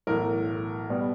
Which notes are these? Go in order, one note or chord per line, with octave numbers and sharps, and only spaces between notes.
B1 A2 E3 A#4
B2 G3 B3